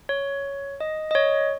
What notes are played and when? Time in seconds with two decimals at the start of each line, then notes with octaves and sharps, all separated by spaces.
0.09 C#5
0.80 D#5
1.11 D#5
1.15 C#5